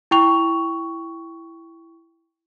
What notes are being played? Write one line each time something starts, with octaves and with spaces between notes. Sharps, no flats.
E4 G5 C#6 F7